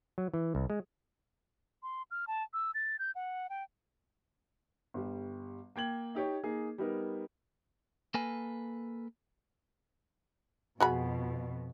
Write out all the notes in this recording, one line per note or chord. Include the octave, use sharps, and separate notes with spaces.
F#3
E3
C2
G#3
C6
F6
A5
E6
A6
G6
F#5
G5
G1 G3
A#3 G5 G#6 F#7
D#4 G4 C#5
A#3 D#4 G#4
G3 B3 D#4 A#4
A#3 A4 B4 G#5
F2 B2 F#4 G#4 B5